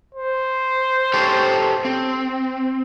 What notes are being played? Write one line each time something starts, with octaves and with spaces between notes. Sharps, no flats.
C5
G4 A4 C#5
C4